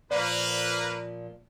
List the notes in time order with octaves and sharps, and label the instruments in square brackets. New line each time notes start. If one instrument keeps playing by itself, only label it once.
[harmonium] A#2 F3 [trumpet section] A#3 B4 [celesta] D5